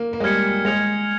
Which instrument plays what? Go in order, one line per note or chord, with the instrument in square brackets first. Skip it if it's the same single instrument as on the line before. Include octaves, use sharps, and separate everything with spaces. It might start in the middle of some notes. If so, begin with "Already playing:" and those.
Already playing: [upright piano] A#3
A#3
G#3
[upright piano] G3 [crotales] F6 G#6 C#7
[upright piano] G#3 [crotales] F6 G#6 C#7 F7